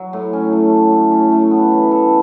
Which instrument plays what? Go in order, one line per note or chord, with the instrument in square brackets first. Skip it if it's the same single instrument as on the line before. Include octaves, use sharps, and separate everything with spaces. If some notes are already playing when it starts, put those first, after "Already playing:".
Already playing: [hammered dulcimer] F#3
A2
C#4
A3
F#3
A2
C#4
A3
B3
E3
A4